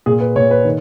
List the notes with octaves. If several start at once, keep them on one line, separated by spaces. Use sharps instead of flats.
A#2 G#4
B4
A#2 C#5
B4
D#3